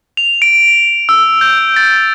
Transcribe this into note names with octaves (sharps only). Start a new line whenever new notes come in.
F7
D7
E6
G6
A6